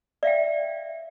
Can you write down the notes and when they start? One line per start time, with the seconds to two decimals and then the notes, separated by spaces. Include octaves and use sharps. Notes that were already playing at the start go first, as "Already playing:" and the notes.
0.23 D5 E5 F5 G5